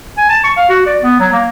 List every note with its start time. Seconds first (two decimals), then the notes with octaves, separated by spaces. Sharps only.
0.18 G#5
0.29 A5
0.44 C#6
0.57 F5
0.69 F#4
0.87 D5
1.02 B3
1.20 F#3
1.33 A#3